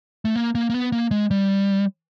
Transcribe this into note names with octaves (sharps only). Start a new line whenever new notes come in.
A3
A#3
A#3
A#3
B3
A#3
G#3
G3